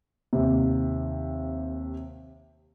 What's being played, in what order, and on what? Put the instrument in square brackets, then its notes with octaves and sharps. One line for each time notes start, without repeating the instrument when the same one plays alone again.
[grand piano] D#2 C3